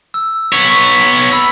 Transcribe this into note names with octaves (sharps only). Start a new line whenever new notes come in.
E6
B3 C#5
C#6 B6
B5 E6 B6